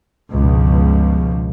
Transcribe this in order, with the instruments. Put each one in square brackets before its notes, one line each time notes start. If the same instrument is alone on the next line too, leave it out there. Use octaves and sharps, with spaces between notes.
[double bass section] G1 C#2 B2 F3